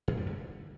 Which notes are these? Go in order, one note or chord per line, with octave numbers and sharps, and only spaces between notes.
F#2
G3
D3